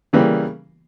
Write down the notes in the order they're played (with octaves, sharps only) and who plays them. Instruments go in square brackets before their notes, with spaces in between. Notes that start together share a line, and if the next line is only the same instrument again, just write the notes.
[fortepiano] C#3 E3 G3 A#3